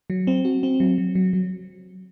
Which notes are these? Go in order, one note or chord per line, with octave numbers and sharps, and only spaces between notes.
F#3
C4
F#4
C4
F#3
F#3
F#3
F#3